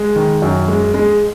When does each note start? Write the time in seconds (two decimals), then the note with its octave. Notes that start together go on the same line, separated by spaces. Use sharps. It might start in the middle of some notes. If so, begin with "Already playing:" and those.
Already playing: G#3
0.16 D#3
0.42 F#2
0.68 G#3
0.94 G#3